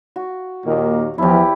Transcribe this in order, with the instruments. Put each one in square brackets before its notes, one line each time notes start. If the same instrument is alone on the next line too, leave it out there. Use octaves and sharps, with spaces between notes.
[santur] F#4
[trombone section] D#2 A#2 D#3 [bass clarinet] A#3
[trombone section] E2 [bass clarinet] F3 [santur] E4 G4